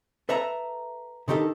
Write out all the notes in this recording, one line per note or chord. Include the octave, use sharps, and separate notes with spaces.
A4 B4 E5 A5 A#5
D3 D#3 D#4 G4 A4